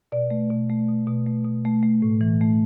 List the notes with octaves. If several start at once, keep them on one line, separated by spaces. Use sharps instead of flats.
B2 D5
A3
B2
A3
B2
B2
A3
B2
A3
A3
A2
E3
A3